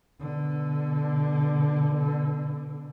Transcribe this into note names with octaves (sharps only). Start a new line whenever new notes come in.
B2 D3